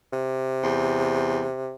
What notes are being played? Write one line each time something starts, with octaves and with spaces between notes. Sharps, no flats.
C3
E2